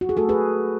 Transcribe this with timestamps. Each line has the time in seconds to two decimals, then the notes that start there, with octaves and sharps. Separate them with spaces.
0.01 F#4
0.09 G#4
0.17 A3 F#4 A4
0.29 G#4 B4